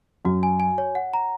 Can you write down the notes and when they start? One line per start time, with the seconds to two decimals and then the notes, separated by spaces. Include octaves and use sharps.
0.25 F#2 F#3 F#4
0.43 G#5
0.60 G#5
0.78 C#5
0.95 F#5
1.14 A#5